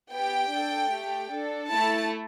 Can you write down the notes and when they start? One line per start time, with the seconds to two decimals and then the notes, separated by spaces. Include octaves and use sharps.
0.12 B3 G4 G5
0.51 D4 A4
0.91 A3 G4
1.32 D4 A4
1.71 A3 E4 A4 A5